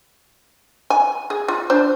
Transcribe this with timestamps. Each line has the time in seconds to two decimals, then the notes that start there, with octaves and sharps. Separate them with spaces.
0.90 G#5
1.30 G#4
1.48 F4
1.70 D4 C5